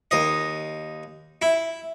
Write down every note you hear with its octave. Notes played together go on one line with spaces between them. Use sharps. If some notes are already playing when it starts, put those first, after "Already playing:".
D#2 D#5
E4